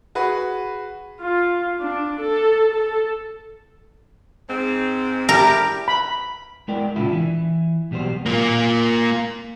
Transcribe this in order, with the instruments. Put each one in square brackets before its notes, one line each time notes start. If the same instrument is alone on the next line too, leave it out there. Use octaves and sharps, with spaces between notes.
[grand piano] F#4 G#4 B4
[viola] F4
D4
A4
A4
[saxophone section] G#2 C4
[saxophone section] D4 E4 G4 [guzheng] A#4
[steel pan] B5
[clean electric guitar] G#3 B3 E4 A#4 D5 G5
A#2 C#3 D4 E4 F4
E3 E4
B1 B2 G3 B3 C5
[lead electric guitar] A#3 F4